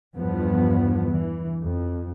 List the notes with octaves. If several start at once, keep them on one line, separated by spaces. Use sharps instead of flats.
E2 G2 F3 B3
E3
F2